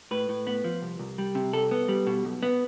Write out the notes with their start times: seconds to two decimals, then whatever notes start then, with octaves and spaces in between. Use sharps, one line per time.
0.11 A2 B4
0.29 A2
0.47 B3
0.64 F3
0.82 C2
0.99 C2
1.18 G3
1.35 C3
1.53 C2 A4
1.71 B3
1.88 G3
2.07 B2
2.25 B1
2.43 B3